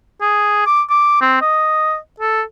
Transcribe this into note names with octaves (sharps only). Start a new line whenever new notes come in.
G#4
D6
D6
C4
D#5
A4